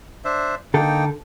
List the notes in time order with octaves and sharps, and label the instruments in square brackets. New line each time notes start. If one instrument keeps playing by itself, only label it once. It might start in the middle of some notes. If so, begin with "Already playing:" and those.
[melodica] D4 C5 E5
[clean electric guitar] D3 A4 [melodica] A#3 D#4 G5